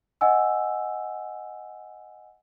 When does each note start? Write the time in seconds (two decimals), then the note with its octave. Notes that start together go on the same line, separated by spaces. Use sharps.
0.21 D#5 F#5 G#5 E6